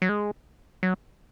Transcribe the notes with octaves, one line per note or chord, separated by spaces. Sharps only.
F#3
G#3
F#3